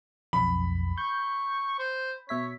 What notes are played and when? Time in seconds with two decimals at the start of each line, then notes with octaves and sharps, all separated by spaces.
0.33 B1 F2 B5
0.98 C#6 G6
1.79 C5
2.29 B2 C#5 E5 B6